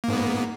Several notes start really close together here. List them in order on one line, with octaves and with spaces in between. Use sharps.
A#3 G#2 B3